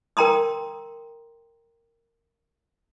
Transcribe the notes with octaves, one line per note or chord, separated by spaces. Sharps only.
A#4 G5 A#5 C6 D#6